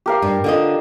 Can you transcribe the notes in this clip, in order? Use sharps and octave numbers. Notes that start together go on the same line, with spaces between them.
G4 A#4 F5
G2
D3 F4 D#5